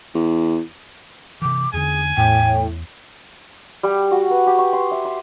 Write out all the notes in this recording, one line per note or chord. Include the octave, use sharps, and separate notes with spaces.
E2
C3 E3 D6
E2 D3 G#4 G#5
E2 A2 G5
G3
F#4
B4
G4
C#6
C6
E5
C6